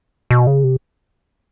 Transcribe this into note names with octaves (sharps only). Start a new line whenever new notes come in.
B2
C#3
C3